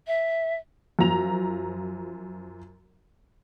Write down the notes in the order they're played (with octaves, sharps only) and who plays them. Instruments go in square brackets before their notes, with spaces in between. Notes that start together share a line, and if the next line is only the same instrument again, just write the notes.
[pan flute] E5
[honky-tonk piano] F#2 F3 A#5 F7